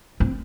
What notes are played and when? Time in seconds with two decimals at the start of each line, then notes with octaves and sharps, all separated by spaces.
0.20 C4